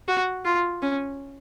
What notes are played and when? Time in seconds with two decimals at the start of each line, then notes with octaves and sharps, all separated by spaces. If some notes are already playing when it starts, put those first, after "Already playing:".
0.08 F#4
0.45 F4
0.82 C#4